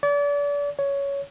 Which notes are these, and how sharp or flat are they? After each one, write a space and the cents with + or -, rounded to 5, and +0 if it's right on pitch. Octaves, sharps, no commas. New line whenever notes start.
D5 -35
C#5 +10